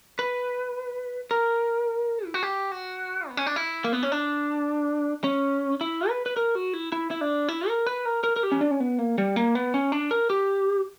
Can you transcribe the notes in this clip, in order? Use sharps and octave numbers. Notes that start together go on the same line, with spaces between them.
B4
A#4
E4
F#4
G4
F#4
B3
C#4
D4
E4
A#3
B3
C#4
D4
C#4
E4
B4
B4
A#4
F#4
E4
E4
E4
D4
E4
A#4
B4
A#4
A#4
A#4
G4
C#4
D4
C#4
B3
A#3
G3
A#3
B3
C#4
D4
A#4
G4